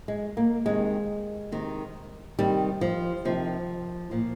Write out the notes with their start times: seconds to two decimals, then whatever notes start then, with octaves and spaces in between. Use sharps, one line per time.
0.08 G#3
0.37 A#3
0.66 C3 D#3 G#3
1.52 C3 D#3
2.39 C3 D#3 G3
2.81 F3
3.25 C3 D#3 F3
4.11 A#2 F3